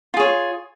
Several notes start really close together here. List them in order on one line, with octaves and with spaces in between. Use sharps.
F4 G#4 C#5